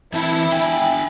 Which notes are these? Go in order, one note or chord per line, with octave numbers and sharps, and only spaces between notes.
E3 C4 E4 A5
D4 G5 G#5